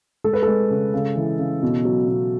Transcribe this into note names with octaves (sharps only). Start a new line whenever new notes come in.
G#3 A4
B4
G#3 A4
C#3
C#3
E3
C#3
B2
F#3
B2